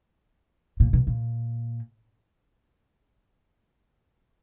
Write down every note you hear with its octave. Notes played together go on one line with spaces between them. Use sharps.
A#2
B2
A#2